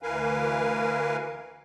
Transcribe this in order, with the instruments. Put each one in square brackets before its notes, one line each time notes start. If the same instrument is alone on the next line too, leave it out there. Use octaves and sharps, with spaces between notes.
[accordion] D2 E3 A#4 B4 F5 G#5